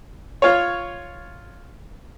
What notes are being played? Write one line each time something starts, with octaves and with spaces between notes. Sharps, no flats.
F4 C#5